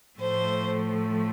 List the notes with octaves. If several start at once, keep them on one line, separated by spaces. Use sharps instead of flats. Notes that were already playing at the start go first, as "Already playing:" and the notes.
A2 F3 A3 C5